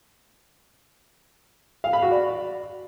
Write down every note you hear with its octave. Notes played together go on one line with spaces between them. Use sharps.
F5
B5
F#4
D5